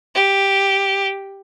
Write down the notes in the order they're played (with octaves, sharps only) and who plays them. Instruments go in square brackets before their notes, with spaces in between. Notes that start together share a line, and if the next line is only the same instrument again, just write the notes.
[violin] G4